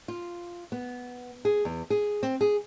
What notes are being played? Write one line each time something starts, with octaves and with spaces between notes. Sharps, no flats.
F4
B3
G#4
E2
G#4
C4
G#4